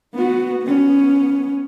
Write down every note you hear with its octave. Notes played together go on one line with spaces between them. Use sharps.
B3 F#4
B3 C#4